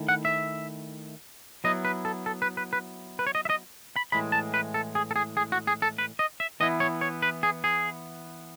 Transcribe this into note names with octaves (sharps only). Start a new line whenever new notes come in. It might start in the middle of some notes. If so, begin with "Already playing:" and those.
Already playing: D#3 A3 E4
F#5
E5
F#3 B3 E4 D#5
B4
A4
A4
B4
B4
B4
B4
C#5
D#5
E5
D#5
B5
A2 E3 G#3 B5
A5
B4
A4
G#4
A4
G#4
G#4
F#4
G#4
A4
B4
D#5
E5
E3 B3 E4 D#5
C#5
C#5
B4
G#4
G#4